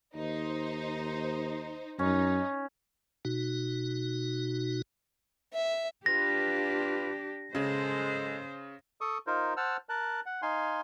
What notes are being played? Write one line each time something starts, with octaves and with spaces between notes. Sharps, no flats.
D#2 D#4 C5
F#2 C#4 D#4
B2 D#4 F#4
E5
D4 F4 G4 B4 A#6
C#3 G#3 A4 C5
A4 C#6 D#6
D#4 F4 A#4 C5
C5 F#5 A5 E6 F6
A#4 A5 F#6
F#5
D#4 F5 G#5 C6